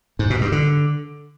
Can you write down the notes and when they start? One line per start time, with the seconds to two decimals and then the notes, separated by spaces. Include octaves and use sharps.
0.19 G#2
0.30 B2
0.41 G2
0.52 D3